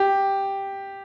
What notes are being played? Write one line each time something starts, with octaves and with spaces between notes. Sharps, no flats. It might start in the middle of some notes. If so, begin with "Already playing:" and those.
Already playing: G4